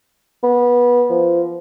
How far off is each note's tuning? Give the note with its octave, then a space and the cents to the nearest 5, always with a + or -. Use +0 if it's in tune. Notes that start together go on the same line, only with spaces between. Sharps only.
B3 -20
F3 -25